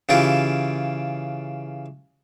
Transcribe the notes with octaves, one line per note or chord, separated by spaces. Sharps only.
C#3 E3 E4 F4 G4